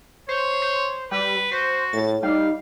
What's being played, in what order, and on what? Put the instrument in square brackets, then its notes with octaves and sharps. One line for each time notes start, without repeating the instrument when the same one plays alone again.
[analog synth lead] C5 [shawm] C#5
[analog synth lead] C5
[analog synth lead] G3 [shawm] B4
[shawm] F#4 [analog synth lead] C5
[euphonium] A2 [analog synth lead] A6
[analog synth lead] G3 [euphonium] D#4 [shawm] F5